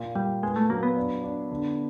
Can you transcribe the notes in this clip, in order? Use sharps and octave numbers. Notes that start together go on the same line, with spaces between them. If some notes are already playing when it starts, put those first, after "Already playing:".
Already playing: A#2
A#2 G3
G#3 B3
A3
F#3 A#3
B3
D4
D4
D3